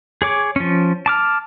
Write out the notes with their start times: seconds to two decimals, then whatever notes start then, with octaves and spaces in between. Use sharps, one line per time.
0.22 G#4 C#5 D6
0.56 F3 C#4
1.06 A5 D6 F6